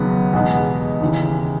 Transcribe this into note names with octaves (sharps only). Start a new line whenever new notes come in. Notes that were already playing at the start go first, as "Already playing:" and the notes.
Already playing: D#2 C#3 F#3 B3
E2 B2 G#3 B3 D#4
D#2 C#3 E3